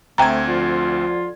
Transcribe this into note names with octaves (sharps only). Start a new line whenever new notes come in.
D2 A3 C4 G5 A#5 G#6
D3 F3 F4